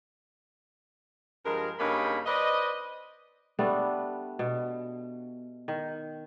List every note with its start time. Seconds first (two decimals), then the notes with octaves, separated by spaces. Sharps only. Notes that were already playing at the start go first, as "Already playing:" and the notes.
1.45 G2 F3 G#3 A#4
1.79 G2 C#3 A#3 D#4 C#5 B5
2.26 B4 C5 D5 D#5
3.59 G3 A3 B3 D4
4.39 B2
5.68 D#3